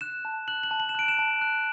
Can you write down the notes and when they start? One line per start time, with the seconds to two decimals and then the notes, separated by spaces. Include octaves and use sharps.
0.01 F#6 E7
0.25 A5
0.48 F#6 F#7
0.63 F#7
0.71 A5
0.80 F#7
0.89 E7
0.95 F#6 D7
1.08 E7
1.19 A5
1.41 F#6